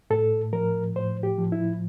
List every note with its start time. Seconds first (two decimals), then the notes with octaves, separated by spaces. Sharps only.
0.10 A2 A4
0.53 F3 A#4
0.96 A2 C5
1.23 G4
1.38 F3
1.52 E4